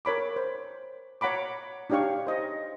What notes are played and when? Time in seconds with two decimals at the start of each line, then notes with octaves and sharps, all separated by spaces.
0.05 A#4 C#5 B5 D6
0.36 C5
1.21 C#5 F#5 A#5 B5 D6
1.90 D4 D#4 G4 C#5 F5 C#6
2.27 C5 D#5